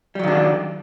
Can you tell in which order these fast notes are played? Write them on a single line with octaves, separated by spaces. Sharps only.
G3 F#3 D#3 D4 A4